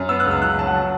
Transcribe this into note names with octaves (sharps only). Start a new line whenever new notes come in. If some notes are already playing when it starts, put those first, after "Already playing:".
Already playing: F#2
B3 E6
F#6
C#2
E6
F#3 F#6
F#3 A5
F#5
A5